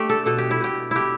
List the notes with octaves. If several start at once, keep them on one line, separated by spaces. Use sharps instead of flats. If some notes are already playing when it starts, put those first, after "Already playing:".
Already playing: A3 D4 G4
A4
B2 A4
G4
E4
B2 G4
D4 E4 G4